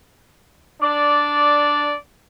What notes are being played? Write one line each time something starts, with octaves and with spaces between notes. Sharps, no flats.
D4 D5